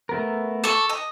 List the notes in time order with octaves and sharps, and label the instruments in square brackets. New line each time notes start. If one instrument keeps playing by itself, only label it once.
[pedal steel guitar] A3 B3 A#4
[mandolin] A4 C#6 [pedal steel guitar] D6
[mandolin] D#5